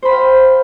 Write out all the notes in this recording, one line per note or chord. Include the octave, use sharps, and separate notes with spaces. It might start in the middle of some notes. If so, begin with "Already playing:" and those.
C5 F5 G5 B5